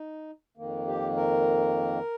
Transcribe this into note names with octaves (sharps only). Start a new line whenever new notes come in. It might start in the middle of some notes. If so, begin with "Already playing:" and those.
Already playing: D#4
F2 D#3 A#3
G4
A#4